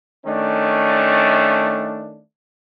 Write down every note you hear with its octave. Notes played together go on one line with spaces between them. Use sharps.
D#3 A3 C#4 D4